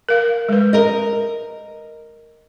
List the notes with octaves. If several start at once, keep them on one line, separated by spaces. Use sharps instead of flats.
A#4 F5
G#3 B4
A#4 D#5